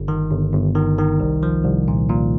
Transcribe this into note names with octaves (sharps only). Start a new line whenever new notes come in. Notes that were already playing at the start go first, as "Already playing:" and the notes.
Already playing: G1
D#3
G1
G1
D#3
D#3
C2
F3
C2
A#2
A#2